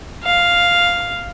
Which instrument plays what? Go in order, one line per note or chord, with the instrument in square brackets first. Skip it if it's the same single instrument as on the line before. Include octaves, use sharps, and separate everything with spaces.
[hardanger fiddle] F5